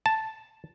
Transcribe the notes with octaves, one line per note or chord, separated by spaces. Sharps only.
A5